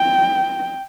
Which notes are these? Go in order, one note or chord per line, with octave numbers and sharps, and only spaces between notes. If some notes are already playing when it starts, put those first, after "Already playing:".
Already playing: G5